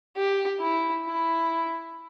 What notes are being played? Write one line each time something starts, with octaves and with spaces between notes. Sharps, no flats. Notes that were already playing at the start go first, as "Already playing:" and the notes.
G4
E4
E4